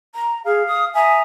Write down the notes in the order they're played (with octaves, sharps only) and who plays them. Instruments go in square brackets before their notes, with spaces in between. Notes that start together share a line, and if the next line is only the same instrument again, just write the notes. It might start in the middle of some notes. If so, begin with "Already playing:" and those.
[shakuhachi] A#5
[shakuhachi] G#4 [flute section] F5
[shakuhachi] D#6
[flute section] E5 A#5 D#6 [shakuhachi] G#5